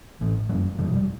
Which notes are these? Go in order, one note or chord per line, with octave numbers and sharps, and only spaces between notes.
A1 A2
F#1 F#2 F#3
E1 E2 B2 G3
G3